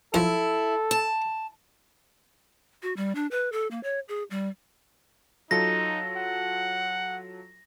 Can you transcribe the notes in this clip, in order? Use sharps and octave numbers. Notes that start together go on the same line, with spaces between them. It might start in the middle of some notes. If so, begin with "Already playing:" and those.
F#2 F3 E4 A4
A5
F#4
G3
D4
B4
A4
A#3
C#5
G#4
G3
F#3 D#4 F4 A4 A#6
F#5